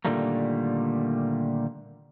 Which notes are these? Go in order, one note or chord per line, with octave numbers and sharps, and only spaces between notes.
A#2 D3 D#3 G3 A3 A#3